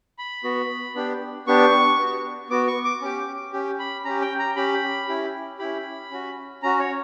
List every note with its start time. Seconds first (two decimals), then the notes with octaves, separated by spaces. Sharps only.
0.18 B5
0.44 B3 F#4
0.95 B3 D4 G4
1.47 B3 D4 G4 C#6
1.99 B3 F#4
2.50 B3 F#4 D6
2.67 C#6
2.85 D6
3.01 C#4 G4
3.53 C#4 G4
3.79 B5
4.05 C#4 G4 A#5
4.22 G5
4.39 A#5
4.56 C#4 G4 B5
5.08 C#4 E4 G4
5.59 C#4 E4 G4 B5
6.11 C#4 F#4
6.63 C#4 F#4 A#5
6.80 C#5